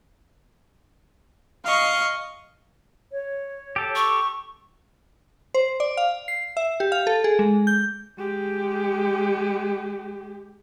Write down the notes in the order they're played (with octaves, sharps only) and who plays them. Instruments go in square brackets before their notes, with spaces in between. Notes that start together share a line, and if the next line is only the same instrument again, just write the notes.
[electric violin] D#5 C#6 [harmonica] F5
[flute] C#5
[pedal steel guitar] G4 A4
[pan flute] C#6
[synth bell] C5
D5
F5
C7
E5
G4
F5
A4
G#4
G#3
G6
[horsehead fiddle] G#3 G4